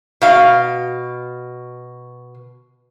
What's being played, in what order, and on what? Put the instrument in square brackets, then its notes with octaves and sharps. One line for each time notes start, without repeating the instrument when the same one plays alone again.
[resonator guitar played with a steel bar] B2 F5